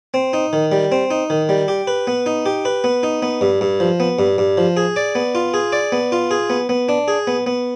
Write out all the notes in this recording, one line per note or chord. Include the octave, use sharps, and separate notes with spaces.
C4
D#4
D#3
G3
C4
D#4
D#3
G3
G4
B4
B3
D#4
G4
B4
B3
D#4
B3
G2
G2
F3
B3
G2
G2
F3
G#4
D5
B3
F4
G#4
D5
B3
F4
G#4
B3
B3
D4
G#4
B3
B3